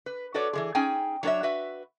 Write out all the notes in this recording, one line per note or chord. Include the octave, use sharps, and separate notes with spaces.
B4
F#4 A4 B4 C#5 D5
E3 F3 G#4
C#4 D#4 G#4 G5 G#5
F#3 D4 G#4 A4 C#5 E5
F#4 B4 E5